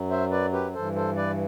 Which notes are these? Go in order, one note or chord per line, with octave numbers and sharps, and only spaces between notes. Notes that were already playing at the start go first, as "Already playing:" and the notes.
Already playing: F#2 F#3
C5 E5
B4 D5
G4 B4
G2 E3 A4 C5
A4 C5
B4 D5